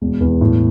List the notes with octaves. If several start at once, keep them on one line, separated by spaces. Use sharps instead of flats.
E1
E2
A2